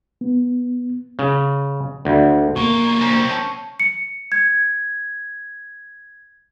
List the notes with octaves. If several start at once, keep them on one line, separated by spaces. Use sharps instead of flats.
B3
C#3
D2
B1 A#3 C#6
C4 C#4
A5
C#7
G#6